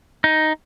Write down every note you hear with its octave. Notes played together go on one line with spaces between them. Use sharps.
D#4